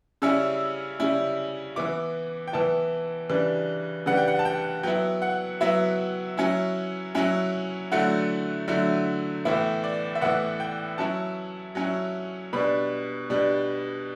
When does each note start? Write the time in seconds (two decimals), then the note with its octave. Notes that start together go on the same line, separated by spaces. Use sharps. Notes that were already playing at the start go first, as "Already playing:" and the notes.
0.22 C#3 G3 C#4 E4 E6
1.00 C#3 G3 C#4 E4
1.76 E3 B3 E4 D6
2.47 G5
2.53 E3 B3 E4 A5
3.30 C#3 E3 G3 D4
4.06 C#3 E3 G3 D4 F#5
4.17 G5
4.28 F#5
4.39 A5
4.45 G5
4.83 F#3 B3 E4 G5
5.22 F#5
5.61 F#3 B3 E4 E5
6.37 F#3 C#4 E4
7.15 F#3 C#4 E4
7.92 D3 F#3 A3 E4 F#5
8.68 D3 F#3 A3 E4
9.45 A2 E3 B3 E4 E5
9.84 D5
10.15 E5
10.21 A2 E3 B3 E4 F#5
10.60 G5
10.98 F#3 C#4 E4 A5
11.75 F#3 C#4 E4
12.53 B2 G3 D4 B5
13.30 B2 G3 D4